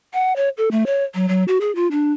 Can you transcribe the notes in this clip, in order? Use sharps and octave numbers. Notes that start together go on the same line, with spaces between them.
F#5
C#5
A4
A3
C#5
F#3
F#3
F#4
G#4
F4
D4